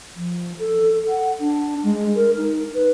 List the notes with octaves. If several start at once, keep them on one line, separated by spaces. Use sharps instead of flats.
F3
A4
F#5
D4
G#3
A#4
D#4
B4